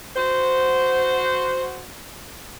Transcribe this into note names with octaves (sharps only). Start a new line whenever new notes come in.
F#4 C5